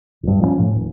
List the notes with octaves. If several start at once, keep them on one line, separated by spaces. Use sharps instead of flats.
D1 G2
F3 G3 C#4
A2
D#1